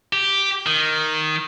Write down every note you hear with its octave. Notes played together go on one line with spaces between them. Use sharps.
G4
D#3